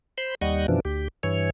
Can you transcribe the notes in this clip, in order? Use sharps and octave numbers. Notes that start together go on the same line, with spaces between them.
C5 B5 C6
D#2 G3 D#5 F#5 C#6
F#2 B2 E3 F3 D4
D2 G4
G2 E3 C#5